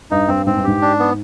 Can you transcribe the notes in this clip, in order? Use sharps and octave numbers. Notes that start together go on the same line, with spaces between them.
G2 D#4
G2 C4
G#2 C4
G2
G#2 G4
D4
B3